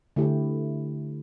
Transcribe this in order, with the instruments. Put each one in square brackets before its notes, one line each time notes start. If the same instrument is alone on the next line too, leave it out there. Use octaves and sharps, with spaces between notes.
[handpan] D3 A3 E4 G4